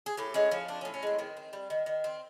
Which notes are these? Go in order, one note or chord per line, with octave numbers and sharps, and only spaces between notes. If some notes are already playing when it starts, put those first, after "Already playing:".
G#4
A2 G4
G#3 C#4
F3 C#4
C4 D4
C#4
A2
C#4
G#3 C4
D#3 C4
C4
G3
D#3
D#3
C4